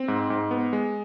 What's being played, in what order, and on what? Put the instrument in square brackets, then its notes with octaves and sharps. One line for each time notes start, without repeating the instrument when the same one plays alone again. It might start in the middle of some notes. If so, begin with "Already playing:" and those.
Already playing: [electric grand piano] C4
G#2
G#2
B3
G#3